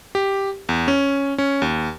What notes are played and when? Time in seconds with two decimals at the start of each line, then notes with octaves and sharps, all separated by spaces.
0.15 G4
0.69 E2
0.88 C#4
1.38 C#4
1.62 D#2